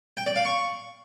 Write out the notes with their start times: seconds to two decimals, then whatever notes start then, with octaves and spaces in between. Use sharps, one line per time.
0.17 G5
0.26 D5
0.36 F5
0.45 C#6